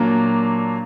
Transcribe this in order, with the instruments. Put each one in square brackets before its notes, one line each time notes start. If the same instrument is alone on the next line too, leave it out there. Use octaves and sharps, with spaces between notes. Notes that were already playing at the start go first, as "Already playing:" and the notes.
Already playing: [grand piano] A#2 F#3 A#3 D4